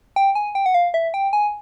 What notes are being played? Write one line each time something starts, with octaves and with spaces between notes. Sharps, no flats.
G5
G#5
G5
F#5
F5
E5
G5
G#5